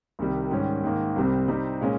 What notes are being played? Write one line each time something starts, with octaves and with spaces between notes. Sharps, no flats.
C2 C3 D#3 G3
G#2 D#3 G3 C#4
G#2 D#3 A#3
C2 C3 G3 C4
C3 G3 C4 D#4
A#2 G#3 C#4